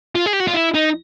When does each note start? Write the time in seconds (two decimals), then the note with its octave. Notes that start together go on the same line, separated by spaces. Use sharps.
0.15 F4
0.26 G#4
0.33 G4
0.40 F#4
0.47 F4
0.54 E4
0.75 D#4